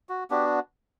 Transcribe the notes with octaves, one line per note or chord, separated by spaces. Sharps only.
F#4
B3 D4 F#4 G4